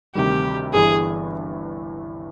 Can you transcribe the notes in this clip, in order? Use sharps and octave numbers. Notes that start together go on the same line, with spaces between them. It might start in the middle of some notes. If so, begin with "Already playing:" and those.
D2 C3 D#3 G3 G4
G1 G2 E3 G#4